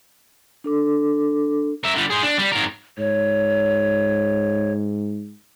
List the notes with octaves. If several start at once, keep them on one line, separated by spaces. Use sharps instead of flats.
D4 A4 D6
A#4 E5
D3 G3
G#4 C5
D4
G3
G#2 A#4
G#2 C#5